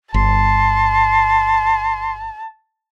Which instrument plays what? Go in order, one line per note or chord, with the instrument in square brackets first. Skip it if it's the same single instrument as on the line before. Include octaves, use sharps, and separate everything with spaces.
[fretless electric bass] G1 [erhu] A5 [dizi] C6